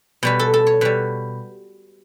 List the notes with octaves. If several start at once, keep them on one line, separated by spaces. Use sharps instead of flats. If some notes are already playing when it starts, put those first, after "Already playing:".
B2 G3 B4
A4
A4
C#5
B2 G3 B4